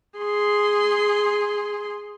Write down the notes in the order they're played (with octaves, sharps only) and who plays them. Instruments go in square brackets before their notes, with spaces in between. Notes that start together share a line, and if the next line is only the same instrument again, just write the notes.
[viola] G#4 C6